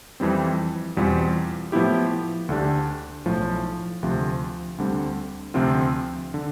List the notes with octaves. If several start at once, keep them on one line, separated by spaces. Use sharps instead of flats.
F2 E3 G3 C4
E2 B2 G3 C4 F4
A2 F3 B3 E4 G4
D2 D3 A3 D4 G4
B1 A2 F3
D2 C3 F3
D2 D3 G3 C4
D2 C3 F3 C4 F4
D3